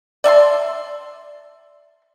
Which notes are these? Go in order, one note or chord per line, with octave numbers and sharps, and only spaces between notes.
D5 E5 A5 C6